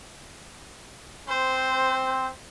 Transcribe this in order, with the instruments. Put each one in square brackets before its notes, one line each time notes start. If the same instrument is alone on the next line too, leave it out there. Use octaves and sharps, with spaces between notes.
[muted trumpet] C4 [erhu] C5